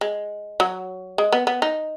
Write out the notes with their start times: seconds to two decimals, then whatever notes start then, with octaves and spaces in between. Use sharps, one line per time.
0.01 G#3
0.60 F#3
1.18 G#3
1.32 B3
1.47 B3
1.62 D#4